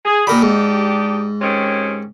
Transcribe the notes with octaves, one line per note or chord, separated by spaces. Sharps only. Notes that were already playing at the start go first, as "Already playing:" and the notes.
G#4
A#2 D4 D#4 G4 A#4 B5
G#2
C3 D#3 C#4